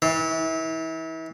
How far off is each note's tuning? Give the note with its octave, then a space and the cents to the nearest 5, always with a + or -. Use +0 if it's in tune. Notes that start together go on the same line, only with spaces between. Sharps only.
E3 -35